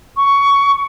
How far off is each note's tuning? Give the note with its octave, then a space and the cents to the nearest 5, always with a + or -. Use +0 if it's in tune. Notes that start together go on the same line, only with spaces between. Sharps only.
C#6 +15